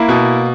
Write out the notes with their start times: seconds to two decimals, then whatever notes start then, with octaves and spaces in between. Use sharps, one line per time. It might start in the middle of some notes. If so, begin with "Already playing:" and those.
Already playing: A#3 E4
0.09 B2